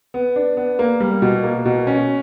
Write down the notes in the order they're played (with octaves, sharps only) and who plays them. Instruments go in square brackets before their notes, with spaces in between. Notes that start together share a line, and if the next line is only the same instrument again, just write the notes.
[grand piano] B3
D4
B3
A#3
G3
B2
A#3
B2
C#4